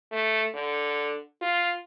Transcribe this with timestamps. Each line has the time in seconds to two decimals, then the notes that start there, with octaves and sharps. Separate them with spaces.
0.12 A3
0.54 D3
1.42 F4